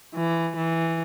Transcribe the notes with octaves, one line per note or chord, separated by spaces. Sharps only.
E3
E3